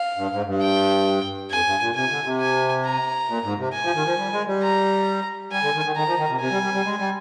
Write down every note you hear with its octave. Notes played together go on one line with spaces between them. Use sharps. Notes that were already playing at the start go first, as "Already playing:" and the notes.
Already playing: F5
G2
G#2
G2
G5
F2 G#5
G2
A#2
C3 G#5
D3
C3
G#5
A#5
A#2
G#2
C3
G#5
F3
D#3
F3
G3
G#3
G3
A#5
G3 G#5
D3
D#3
D#3
D#3 A#5
F3
D#3
C3
C3 G#5
G3
G3
G3
G#3
G3